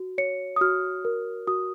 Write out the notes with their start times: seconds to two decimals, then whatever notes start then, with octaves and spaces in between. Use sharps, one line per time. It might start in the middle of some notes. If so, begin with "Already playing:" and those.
Already playing: F#4
0.18 C#5 C#7
0.56 D#6
0.61 F#4 F6
1.05 A#4
1.47 F#4 D#6